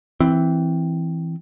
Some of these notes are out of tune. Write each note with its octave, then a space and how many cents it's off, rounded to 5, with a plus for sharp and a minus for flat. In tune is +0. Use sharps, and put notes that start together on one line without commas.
E3 +0 C4 +0